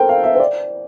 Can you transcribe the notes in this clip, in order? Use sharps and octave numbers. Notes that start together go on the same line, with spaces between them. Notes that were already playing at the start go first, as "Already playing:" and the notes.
Already playing: A4 A#4 C5 G5
F5
E5
C5
D5